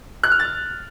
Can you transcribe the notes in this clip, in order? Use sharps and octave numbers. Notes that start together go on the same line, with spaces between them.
F#6
F6
A6